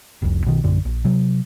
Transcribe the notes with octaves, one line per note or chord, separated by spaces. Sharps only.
F1 C2 F2
B1 B2 D#3
A#1 F#2 D3
A#1
C3 F#3